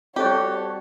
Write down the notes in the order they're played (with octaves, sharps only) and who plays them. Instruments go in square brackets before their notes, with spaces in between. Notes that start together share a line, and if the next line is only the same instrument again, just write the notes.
[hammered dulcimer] G3 F#4 [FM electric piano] C4 A4 A5 [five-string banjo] G4 [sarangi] C#5